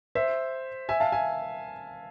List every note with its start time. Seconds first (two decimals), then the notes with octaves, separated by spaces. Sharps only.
0.15 C5 E5
0.89 E5 G#5
1.00 F5 A5
1.12 E5 G#5